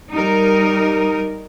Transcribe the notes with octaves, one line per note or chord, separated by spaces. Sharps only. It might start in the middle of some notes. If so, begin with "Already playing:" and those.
G3 D#4 A#4